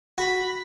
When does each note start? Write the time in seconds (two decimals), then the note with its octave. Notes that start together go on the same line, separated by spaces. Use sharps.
0.18 F#4 B5